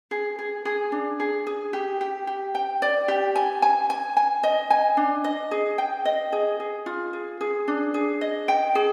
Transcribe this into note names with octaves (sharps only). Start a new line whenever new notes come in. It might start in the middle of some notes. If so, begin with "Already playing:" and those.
G#4
G#4
G#4
D4
G#4
G#4
G4
G4
G4
G5
D5
G4
G#5
G#5
G#5
G#5
D#5
G#5
D4
D#5
G#4
G5
D#5
G#4
G#4
F4
G#4
G#4
D4
G#4
D#5
G5
G#4